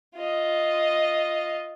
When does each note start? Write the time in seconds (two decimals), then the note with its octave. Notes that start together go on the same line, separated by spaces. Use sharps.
0.16 F4 D#5